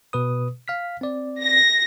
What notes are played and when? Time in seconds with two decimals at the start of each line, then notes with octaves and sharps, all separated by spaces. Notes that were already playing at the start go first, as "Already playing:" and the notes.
0.13 B2 B4 D#6
0.68 F5 F6 B6
1.01 C4 D5
1.42 A#6